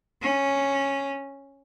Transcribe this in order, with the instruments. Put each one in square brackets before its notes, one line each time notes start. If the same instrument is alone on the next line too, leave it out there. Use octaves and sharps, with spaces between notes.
[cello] C#4